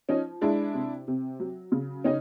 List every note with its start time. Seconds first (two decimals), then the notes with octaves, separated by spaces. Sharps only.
0.09 F3 C#4 D#4
0.41 G#3 D4 E4
0.74 C3
1.08 C3
1.40 F#3
1.72 C#3
2.04 C#3 C#4 D#4